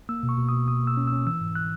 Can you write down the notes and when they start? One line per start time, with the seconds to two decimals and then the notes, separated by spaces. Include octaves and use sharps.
0.09 A#3 E6
0.23 B2
0.29 C#6
0.38 B2
0.49 B2 D#6
0.68 B2 D#6
0.83 A#3 E6
0.97 C#4
1.07 C#4 E6
1.26 E3 E6
1.41 G#2
1.55 F#6